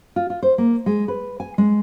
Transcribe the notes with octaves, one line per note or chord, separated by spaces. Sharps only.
F4
F4
C5
A#3
G#3
B4
G#5
G#3